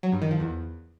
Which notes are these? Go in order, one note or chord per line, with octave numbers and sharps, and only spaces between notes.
F#3
G2
D#3
F3
E2